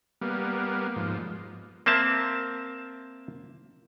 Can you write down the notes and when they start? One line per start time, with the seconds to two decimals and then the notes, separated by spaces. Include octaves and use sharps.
0.21 G3 A#3 B3
0.96 G#2 F3
1.86 A#3 C4 E5 A5